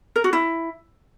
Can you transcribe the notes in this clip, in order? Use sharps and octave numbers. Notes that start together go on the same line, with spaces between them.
A#4
F#4
E4